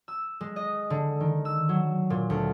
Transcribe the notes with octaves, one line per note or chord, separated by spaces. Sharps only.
E6
G#3
D#5
D3
D#3
E6
F#3
A#2
D2